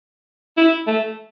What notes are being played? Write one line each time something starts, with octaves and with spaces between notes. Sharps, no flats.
E4
A3